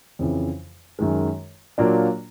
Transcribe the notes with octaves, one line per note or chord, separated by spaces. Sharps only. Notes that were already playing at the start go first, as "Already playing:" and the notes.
F2 C#3 E3
F#2 D#3 G#3
A#2 F#3 A#3 D4 F4